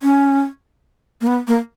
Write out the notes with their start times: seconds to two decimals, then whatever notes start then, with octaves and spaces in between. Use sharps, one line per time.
0.03 C#4
1.21 A#3
1.27 B3
1.48 A#3